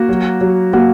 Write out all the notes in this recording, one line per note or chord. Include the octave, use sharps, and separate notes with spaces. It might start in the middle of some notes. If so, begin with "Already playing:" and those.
Already playing: A#3 F#4
F#3
F#3
A#3 F#4